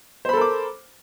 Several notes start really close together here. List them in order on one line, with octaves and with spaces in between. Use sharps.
C5 B5 A4 A#4 D6